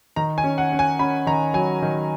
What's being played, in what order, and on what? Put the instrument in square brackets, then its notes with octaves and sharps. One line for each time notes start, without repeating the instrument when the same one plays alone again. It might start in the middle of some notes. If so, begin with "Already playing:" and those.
[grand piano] D#3 A#5
G#5
C#4
F#5
C#4
G#5
C#4 B5
D#3 A#5
F#3 G#5
D#3